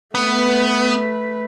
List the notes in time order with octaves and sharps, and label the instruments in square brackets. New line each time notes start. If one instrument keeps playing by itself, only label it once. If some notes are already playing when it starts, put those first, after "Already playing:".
[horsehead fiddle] A3 B4 [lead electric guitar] B3